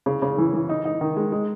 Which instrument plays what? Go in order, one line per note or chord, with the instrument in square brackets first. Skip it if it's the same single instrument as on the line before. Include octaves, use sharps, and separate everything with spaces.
[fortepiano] C#3
C#3
E3
E3
D#4
D#4
D#3
G#3
G#3